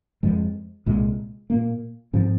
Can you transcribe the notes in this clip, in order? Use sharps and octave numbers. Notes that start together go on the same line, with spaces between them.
F2 F3 G#3
C2 A#2 G#3
A#2 A#3
G#2 F3 C4